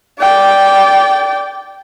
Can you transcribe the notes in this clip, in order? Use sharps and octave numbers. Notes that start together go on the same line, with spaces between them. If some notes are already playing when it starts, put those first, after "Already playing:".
D5 G5